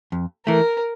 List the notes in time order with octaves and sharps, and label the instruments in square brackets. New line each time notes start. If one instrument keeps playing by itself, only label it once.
[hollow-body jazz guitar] F2
[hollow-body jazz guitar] E3 A3 [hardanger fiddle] A#4